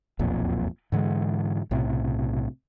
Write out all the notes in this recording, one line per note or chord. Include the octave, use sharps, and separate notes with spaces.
E1 B1 F2 A#2
G#2 D3 E3 G#3
B1 A2 C3